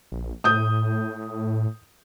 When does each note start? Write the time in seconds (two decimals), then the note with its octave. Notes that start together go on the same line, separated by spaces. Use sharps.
0.12 A#1
0.44 A2 D#6 G6